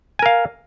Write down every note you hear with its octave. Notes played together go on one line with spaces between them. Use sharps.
A#4 F5 G#5